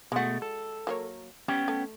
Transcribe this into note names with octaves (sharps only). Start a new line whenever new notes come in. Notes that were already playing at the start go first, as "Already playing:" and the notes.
B2 G#3 A3 F#4
A4
F#3 A#3 C#5
G3 B3 C#4 G5
A3